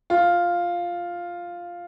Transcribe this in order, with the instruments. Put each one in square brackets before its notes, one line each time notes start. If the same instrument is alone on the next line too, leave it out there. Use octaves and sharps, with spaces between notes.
[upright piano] F4